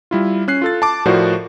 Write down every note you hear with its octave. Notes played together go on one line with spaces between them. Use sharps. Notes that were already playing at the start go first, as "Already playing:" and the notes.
G3 E4 F4
C#4 F#6 C7
F4 A4 A6
A5 D6
A2 F3 F#4 A#4 C5 D5